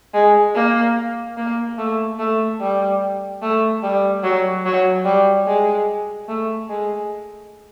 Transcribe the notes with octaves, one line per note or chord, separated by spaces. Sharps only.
G#3
A#3
A#3
A3
A3
G3
A3
G3
F#3
F#3
G3
G#3
A3
G#3